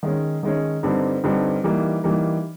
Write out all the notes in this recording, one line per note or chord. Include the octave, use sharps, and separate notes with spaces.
D#3 G#3 C#4
D#3 G#3 C#4
G2 D3 G3 C4 D#4
G2 D3 G3 C4 D#4
E3 G3 A#3 D#4
E3 G3 A#3 D#4